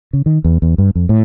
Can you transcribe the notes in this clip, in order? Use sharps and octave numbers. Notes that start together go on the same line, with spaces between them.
C#3
D#3
E2
E2
G2
F2
A2